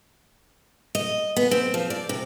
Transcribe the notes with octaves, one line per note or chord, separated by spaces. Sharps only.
D#5
B3
C4
F3
D5
C3